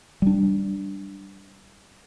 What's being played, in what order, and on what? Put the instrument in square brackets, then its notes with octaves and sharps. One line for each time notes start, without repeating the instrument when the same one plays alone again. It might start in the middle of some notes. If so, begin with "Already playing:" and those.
[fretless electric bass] G3 D4